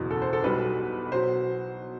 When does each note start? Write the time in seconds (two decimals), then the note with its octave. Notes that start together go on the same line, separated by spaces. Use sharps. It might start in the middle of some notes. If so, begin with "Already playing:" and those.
Already playing: F#1 E2 B2
0.11 A4
0.22 C5
0.33 A4
0.44 B1 B2 G3 B4
1.12 B2 F#3 C5